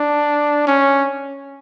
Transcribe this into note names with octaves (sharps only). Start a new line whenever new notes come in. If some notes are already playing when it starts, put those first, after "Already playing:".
Already playing: D4
C#4